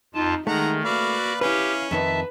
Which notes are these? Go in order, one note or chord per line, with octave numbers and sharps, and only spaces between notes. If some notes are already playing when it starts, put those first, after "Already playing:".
F2 D#4 F4 A5
D#3 G#3 A3 D#4 F#5 A#5
A#3 F#4 B4 D5 F5
C#4 E4 G4 B4 F5
F2 D#3 D#4 B4 E5 A5